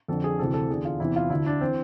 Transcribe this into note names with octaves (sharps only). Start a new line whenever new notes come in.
F2 D3 A4
G#4
D2 C3 E3 A4
A4
E2 D3 G#4
F4
E2 C3 E3 E4
F4
D2 D3 E4
D4
E3 C4